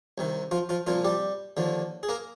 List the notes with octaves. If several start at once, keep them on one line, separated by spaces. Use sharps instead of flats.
C2 C3 D#3
F3 F4
F3 F4
C2 A#2 F3 F4
G3 G4
D#2 D3 F3
G#4
A#3 A#4